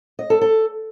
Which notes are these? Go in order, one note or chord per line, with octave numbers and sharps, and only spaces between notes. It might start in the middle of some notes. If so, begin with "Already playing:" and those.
D#5
A4
A4